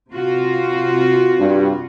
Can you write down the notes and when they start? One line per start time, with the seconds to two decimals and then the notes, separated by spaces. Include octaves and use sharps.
0.13 C3 F4 F#4
1.40 G2